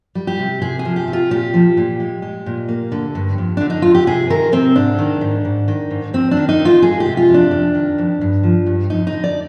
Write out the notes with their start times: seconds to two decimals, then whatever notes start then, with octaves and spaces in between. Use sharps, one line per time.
0.15 G3
0.27 G4
0.39 C3
0.61 C3 G#4
0.79 G#4
0.85 F3
0.96 G4
1.08 C3
1.13 F4
1.31 A#2 G4
1.54 F3
1.77 A#2
2.00 G#3
2.22 G#3
2.46 A#2
2.69 A#3
2.92 D3
3.15 G2
3.38 F2
3.57 D3 D4
3.70 D#4
3.82 F2 F4
3.95 G4
4.07 C3 G#4
4.30 D#3 A#4
4.52 C3 C4
4.75 G#2 D4
4.98 D#3
5.21 G#2
5.45 G#2
5.68 D#3
5.91 G#2
6.14 F2 C4
6.31 D4
6.37 D#3
6.49 D#4
6.59 F2
6.65 F4
6.82 G#3 G#4
7.00 G4
7.06 C3
7.17 F4
7.29 F2
7.34 D4
7.51 F2
7.74 D#3
7.98 F2
8.21 G2
8.43 F3
8.66 G2
8.90 F2 D#4
9.07 D#4
9.12 D3
9.24 D5